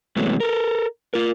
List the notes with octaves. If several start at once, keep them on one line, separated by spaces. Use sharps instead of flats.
C3 E3 F#3 G#3 A3 B3
A4 A#4
F4 A#4